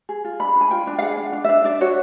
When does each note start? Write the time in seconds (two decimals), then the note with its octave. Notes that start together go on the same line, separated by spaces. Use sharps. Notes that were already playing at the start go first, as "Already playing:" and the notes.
0.09 G#4
0.25 F4
0.40 D4 B5
0.56 D4
0.61 G#5
0.71 F4 G5
0.87 D4
0.99 F5
1.02 G#4 F#5
1.18 D4
1.33 D4
1.44 D4 E5
1.64 D4 D5
1.81 F#4 C#5